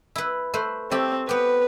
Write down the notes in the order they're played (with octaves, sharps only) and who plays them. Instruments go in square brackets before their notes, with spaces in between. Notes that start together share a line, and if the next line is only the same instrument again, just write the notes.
[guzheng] E4 B4
A3 B4 C5
[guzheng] A3 G4 [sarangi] C4
[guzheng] B3 G4 [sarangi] B4